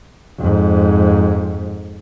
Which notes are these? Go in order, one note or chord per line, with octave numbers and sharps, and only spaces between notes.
F2 G#2